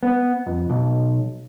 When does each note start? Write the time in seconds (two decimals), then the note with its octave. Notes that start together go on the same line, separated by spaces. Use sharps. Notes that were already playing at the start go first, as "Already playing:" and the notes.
0.03 B3
0.46 F2
0.70 B1